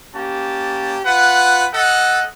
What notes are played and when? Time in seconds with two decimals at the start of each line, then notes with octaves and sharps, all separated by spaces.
0.16 A#3 C#4 G4 A5
1.06 F4 B4 F#5
1.74 A4 D#5 F#5